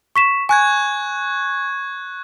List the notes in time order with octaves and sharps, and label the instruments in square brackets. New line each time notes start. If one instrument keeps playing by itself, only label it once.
[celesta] C#6 B6 E7
[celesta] G#5 [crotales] C#6 F#6 G#6